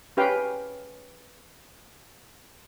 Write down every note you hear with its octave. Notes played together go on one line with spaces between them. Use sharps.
C#4 G4 B4 F5 G5